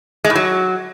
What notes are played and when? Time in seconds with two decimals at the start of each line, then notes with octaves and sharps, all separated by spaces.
0.24 G#3
0.30 A2
0.35 F#3